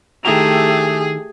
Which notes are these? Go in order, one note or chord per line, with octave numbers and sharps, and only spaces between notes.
D#3 A3 E4 G4 G#4 A#5